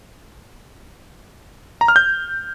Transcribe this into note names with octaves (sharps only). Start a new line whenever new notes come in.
A#5
F6
G6